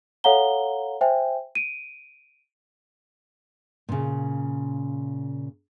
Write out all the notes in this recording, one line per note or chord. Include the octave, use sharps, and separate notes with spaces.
A4 C#5 F5 F#5 A#5 G7
C5 E5 G5 G#5
D7 D#7
A#2 C#3